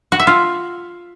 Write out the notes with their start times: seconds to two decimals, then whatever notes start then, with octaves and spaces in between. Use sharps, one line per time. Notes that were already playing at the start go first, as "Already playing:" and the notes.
0.12 F#4
0.20 E5
0.27 F4